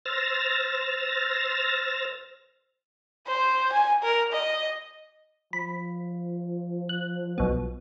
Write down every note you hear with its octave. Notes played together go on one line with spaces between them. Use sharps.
C5 E6 F6 A6 A#6
C5
G#5
A#4
D#5
F3 B5
F#6
B1 B3